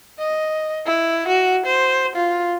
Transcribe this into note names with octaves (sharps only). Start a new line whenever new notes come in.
D#5
E4
F#4
C5
F4